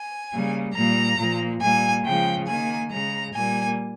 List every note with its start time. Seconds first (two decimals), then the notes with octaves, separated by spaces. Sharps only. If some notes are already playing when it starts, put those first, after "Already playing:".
Already playing: G#5
0.32 C#3 G3 A#3
0.75 A#2 G3 A#3 A#5
1.19 A#2 F3 A#3
1.61 A#2 G3 A#3 G#5
2.05 C#3 F3 G#3 G5
2.47 D#3 A#3 G#5
2.91 C#3 G#3 A#5
3.34 A#2 G3 A#3 G#5